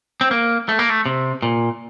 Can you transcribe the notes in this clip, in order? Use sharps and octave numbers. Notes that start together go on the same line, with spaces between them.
C4
A#3
A3
A#3
A3
C3
A#2